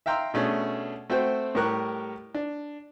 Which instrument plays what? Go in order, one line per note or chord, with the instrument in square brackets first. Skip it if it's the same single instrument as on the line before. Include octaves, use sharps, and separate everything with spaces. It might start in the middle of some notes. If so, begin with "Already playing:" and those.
[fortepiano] E5 F5 G5 A#5 C6 E6
B2 A3 C#4 D4 G#4
A3 C4 F#4 C5 G5
A2 G3 G4 A#4 C#6 F#6
D4